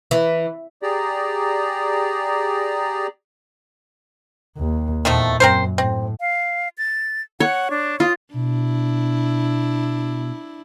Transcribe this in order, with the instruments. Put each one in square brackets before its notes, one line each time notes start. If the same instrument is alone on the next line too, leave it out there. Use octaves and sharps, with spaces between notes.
[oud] E3
[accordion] G4 G#4 D5 A#5
[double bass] D#2
[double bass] E2 A#2 [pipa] D#3 F3 A3
[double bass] F#2 [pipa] C4 A#4 C5
[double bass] A2 [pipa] C4
[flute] F5
A6
[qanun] C#5 [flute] F#5
[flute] D4
[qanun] F4 [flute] D#6
[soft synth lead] B2 [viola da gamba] D4 E4